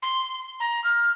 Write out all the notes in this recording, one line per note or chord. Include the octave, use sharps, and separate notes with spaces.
C6
A#5
F6